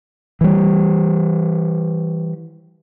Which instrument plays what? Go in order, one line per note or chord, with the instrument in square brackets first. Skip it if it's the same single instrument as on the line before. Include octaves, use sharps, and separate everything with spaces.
[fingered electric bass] E3 G3